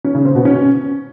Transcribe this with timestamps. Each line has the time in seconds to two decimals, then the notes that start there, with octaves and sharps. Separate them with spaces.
0.04 C#4
0.15 C#3
0.25 C4
0.35 B2
0.45 C#4